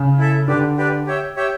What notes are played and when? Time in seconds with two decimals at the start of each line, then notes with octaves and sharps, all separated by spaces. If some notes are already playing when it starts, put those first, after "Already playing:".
Already playing: C#3
0.18 E4 A4 E5
0.48 D3 D4 G4 B4 D5
0.77 D4 G4 B4 D5
1.07 G4 C#5 E5 G5
1.36 G4 C#5 E5 G5